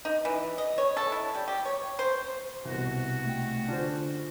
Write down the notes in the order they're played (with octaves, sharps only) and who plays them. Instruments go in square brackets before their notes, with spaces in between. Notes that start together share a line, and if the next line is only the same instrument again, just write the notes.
[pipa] D#4
E3
D#5
C#5
A4
E4
G3
G4
C#5
C5
[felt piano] C2 B2 [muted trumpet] F#4
[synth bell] A3 G5
[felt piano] D3 [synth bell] C#4 F4 C5 [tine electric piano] D4